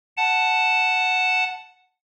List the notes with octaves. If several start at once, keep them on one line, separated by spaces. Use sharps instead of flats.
F#5 A5